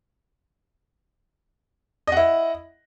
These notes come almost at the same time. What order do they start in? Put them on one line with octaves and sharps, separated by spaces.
D#5 F#5 E4